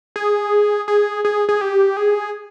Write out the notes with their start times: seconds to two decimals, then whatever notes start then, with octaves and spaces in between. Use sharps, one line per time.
0.16 G#4
0.88 G#4
1.25 G#4
1.49 G#4
1.61 G4
1.97 G#4